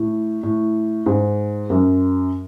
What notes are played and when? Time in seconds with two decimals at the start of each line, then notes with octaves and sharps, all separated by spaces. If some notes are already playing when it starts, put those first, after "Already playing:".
Already playing: A2
0.43 A2
1.06 G#2
1.70 F#2